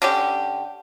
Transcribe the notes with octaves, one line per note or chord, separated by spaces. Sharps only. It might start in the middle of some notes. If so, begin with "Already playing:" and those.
D3 C#4 G4